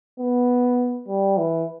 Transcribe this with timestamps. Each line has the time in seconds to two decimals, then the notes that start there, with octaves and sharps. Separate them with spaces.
0.19 B3
1.08 G3
1.38 E3